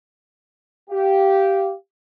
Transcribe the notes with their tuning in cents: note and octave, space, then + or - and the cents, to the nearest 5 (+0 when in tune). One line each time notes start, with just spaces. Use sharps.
G4 -10 F5 -15